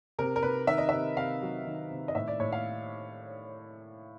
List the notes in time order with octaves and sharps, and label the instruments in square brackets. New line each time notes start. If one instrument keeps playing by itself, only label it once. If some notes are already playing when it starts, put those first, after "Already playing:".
[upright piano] C3 A#4
A#4
C3 B4
D#3 E5
D#5
C3 E5
C3 F5
F#3
D#3
C3
D#5
A2 E5
D5
A2 C#5
F5